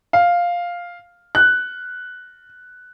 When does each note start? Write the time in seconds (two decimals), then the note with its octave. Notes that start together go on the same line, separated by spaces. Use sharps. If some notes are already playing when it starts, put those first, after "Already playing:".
0.13 F5
1.35 F#6